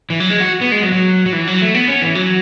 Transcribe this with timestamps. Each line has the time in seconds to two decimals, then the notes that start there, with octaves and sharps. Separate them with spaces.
0.10 E3
0.20 F#3
0.30 G#3
0.40 F#4
0.61 B3
0.72 G#3
0.82 F#3
0.92 F#3
1.26 F#3
1.33 E3
1.47 F#3
1.61 A3
1.74 B3
1.88 C#4
2.02 E3
2.15 F#3